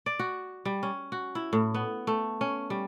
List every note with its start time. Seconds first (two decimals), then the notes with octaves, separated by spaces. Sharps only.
0.06 D5
0.19 F#4
0.65 G3
0.83 C#4
1.12 F#4
1.35 E4
1.53 A2
1.74 B3
2.07 A3
2.41 C#4
2.70 G3